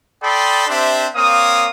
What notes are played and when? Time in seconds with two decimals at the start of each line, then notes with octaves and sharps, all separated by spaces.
0.23 A4 D5 G5 B5 C6 D#6
0.67 C4 D4 G4 C5 E5
1.15 A#3 C4 C#5 F5 D#6